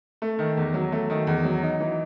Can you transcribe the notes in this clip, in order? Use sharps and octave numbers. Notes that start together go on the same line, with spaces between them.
A3
D#3
E2
F#3
A3
D#3
E2
F#3
D#4
E3